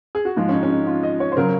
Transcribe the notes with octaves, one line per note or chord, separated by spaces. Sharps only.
G#4
F#4
G#2 F3 G#3 F4
C#4
D#4
C#4
D#4
F4
D#5
C#5
C5
C#3 F#3 A#4